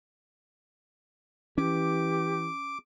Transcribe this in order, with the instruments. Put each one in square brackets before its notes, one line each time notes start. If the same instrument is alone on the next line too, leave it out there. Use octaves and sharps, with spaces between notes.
[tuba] E3 [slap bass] C#4 [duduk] G4 [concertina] D6